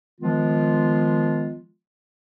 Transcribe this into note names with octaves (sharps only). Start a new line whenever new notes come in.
D#3 F3 G#3 B3 F4